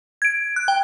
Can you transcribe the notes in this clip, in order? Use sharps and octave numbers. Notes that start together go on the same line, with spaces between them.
G#6 D7
F#6
G5